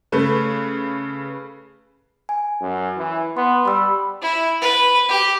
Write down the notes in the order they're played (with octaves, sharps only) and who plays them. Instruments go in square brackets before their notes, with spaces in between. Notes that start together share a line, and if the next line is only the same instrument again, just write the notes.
[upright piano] C#3 A3 B4
[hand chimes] G#5
[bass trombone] F#2
E3
[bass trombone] B3 [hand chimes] C6
[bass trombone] G3 [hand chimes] B5 E6
[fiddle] E4
B4
G4